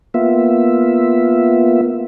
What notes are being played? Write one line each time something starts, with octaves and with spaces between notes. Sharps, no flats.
A#3 B3 F4 E5